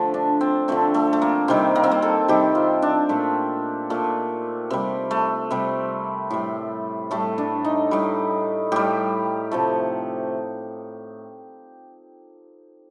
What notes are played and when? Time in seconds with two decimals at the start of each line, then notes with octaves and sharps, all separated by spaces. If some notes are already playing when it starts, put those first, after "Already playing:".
Already playing: D3 F3 A3
0.14 D4
0.41 C4
0.68 D3 F3 A3 C4
0.94 A3
1.13 A3
1.22 A#3
1.48 C3 D#3 G3 C4
1.75 A#3
1.83 C4
1.91 A#3
2.02 A4
2.28 C3 D#3 G3 G4
2.55 F4
2.82 D4
3.09 A#2 A3
3.90 A#2 A3
4.70 C3 G3
5.11 A3
5.51 C3 G3
6.31 A2 G3
7.11 A2 G3 A3
7.38 D4
7.65 D#4
7.91 A2 G3
8.72 A2 G3 G4
9.52 C3 F3 A3